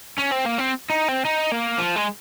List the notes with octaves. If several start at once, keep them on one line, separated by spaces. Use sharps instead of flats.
C#4
C4
A#3
C4
D#4
C4
D#4
A#3
F3
G#3